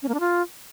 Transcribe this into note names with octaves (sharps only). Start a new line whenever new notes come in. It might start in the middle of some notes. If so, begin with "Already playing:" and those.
C#4
A#3
D4
F4